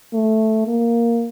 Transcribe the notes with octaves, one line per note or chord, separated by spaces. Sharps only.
A3
A#3